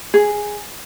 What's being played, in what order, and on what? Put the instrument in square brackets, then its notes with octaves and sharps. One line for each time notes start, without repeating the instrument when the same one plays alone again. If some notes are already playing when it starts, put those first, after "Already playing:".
[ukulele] G#4